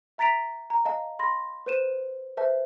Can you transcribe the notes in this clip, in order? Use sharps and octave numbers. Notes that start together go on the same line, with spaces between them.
E5 A#5 A6 B6 D7 F7
A#5
D#5 F5 A5
B5 C6 A#6
B4 C5 D#7 E7
B4 C5 E5 A5